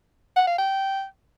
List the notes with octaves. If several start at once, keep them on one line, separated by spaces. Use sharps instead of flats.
F#5
F5
G5